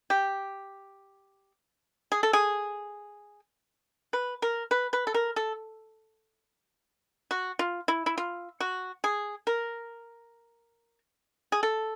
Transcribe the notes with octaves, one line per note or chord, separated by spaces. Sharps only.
G4
G#4
A4
G#4
B4
A#4
B4
B4
A4
A#4
A4
F#4
F4
E4
E4
F4
F#4
G#4
A#4
G#4
A4